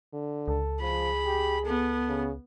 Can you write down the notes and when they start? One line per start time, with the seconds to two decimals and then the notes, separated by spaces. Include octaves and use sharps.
0.13 D3
0.48 C#2 A4
0.81 F3 G#4 B5
1.25 G4
1.65 B3 A4
2.08 C#3